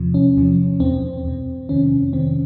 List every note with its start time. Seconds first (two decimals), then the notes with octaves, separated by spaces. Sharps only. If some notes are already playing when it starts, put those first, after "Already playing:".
Already playing: E2 C3 F3
0.14 C#4
0.37 E2 C3 F3
0.80 E2 B2 C4
1.24 E2 B2
1.69 F2 C3 D#3 C#4
2.13 F2 C3 D#3 C4